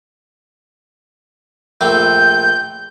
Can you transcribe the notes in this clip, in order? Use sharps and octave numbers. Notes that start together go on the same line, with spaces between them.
A#1 A3 C4 G6